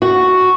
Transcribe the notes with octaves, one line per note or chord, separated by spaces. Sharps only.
F#4